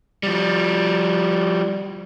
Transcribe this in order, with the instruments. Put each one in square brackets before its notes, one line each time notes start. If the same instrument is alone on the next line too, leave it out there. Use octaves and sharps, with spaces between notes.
[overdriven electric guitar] F3 G3